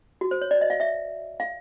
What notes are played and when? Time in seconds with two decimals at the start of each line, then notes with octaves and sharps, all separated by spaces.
0.21 F#4
0.31 C5
0.41 C#5
0.51 D5
0.61 D#5
0.70 F5
0.80 E5
1.40 F5